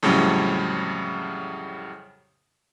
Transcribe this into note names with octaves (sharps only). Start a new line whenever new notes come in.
F2 A2 C#3 F#3 G3 C#4